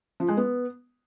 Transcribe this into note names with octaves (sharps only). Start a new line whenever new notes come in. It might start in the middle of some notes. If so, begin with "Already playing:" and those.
F3
G#3
B3